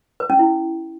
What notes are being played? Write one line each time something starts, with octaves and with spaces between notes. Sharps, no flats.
B4
C#4
E4